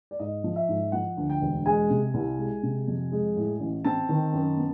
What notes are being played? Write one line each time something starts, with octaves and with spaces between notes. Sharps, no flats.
D5
G#2 D#5
F3
E5
G#2
F3 F#5
D2
G5
E1
G#3 G#5
C3
C2
G#3
C3
F2
G#3
A2
A1
C4 A5
D#3
F#2
B3